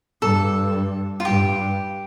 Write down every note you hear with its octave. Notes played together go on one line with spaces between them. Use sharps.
G2 A4
F4
G2 G4